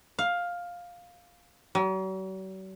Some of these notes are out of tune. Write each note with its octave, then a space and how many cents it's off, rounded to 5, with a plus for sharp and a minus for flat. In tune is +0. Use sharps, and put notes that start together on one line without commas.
F5 +10
F#3 +45